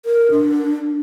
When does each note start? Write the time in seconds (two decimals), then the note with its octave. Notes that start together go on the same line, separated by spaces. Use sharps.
0.06 A#4
0.31 D4